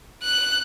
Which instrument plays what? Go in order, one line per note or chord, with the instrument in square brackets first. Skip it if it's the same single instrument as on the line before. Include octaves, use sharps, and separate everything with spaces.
[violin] F#6